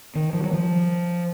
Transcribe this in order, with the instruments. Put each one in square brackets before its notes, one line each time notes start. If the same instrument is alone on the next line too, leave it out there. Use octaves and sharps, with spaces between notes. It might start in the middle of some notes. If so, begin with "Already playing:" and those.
[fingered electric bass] D#3
F3
F#3
F3